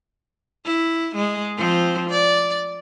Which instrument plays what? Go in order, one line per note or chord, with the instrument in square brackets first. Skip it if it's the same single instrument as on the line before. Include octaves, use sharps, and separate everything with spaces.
[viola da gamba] E4
G#3
F3 C4
D5